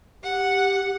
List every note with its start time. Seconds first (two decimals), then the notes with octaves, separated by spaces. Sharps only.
0.23 G4 F#5